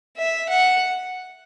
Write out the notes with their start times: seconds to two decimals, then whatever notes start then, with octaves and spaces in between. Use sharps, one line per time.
0.17 E5
0.49 F#5